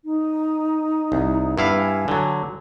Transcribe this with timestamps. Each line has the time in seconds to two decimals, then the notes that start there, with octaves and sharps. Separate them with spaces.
0.05 D#4
1.12 C2
1.58 G2 B3 E4 F5
1.79 G#5
2.08 D3 F#3